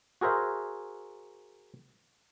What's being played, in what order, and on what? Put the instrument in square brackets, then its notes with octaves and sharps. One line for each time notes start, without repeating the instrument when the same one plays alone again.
[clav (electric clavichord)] F#4 G#4 A#4 C5 E5